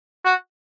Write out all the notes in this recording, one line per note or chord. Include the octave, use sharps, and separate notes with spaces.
F#4